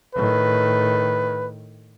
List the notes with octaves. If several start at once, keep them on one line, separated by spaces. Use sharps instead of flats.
A2 D#3 B4